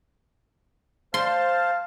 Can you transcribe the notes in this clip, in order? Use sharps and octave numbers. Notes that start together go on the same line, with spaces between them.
C5 F5 A5 C6